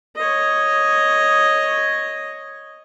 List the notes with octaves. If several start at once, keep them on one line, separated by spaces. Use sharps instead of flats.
C#5 D#5